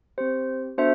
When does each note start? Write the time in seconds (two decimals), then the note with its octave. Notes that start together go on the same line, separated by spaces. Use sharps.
0.18 C4 G4 C5
0.78 B3 D4 F#4 A4 C5 E5